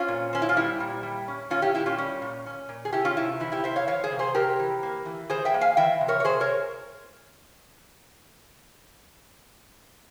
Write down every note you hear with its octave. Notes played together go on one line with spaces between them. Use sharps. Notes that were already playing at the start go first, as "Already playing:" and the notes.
Already playing: C4 C#4 F4
A#2
C4 C#4
E4
F4
G3 E4 G4
A#2
G3
C#4
A#2 C#4 F4
E4 G4
A#2 E4 G4
C#4 F4
G3 C#4
A#2
C#4
A#2
G#4
C3 E4 G4
C#4 F4
C3 E4
E3 E4
E4 G4
C3 C5 E5
C#5 F5
E3 C#5 F5
G#4 C5
C3
G#4 C5
C3 G4 A#4
E3
A#3
E3
E3 G#4 C5
E5 G5
A#3
F5 G#5
E3 E5 G5
C3
A#4 C#5
C#5
C3 G#4 C5
A#4 C#5